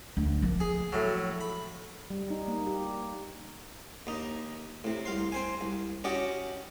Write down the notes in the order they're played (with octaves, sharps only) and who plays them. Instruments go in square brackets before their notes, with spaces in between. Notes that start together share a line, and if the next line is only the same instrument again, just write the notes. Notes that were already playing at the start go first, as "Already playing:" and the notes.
[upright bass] D2
F3 A#3
[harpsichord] G#4
A2 F#3
B5
[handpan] G3
D#4
A#3
G4
[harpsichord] D#2 D#4
A2 C3
C2 F5 C6
C4 C5 G#5
C2
C#4 F#4 G4 D5 D#5 F#5